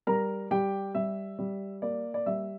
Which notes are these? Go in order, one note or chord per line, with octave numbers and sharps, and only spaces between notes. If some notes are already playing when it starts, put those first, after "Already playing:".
G3 A#4 A#5
G3 G4 G5
G3 E5
G3
A#3 D5
D5
G3 E5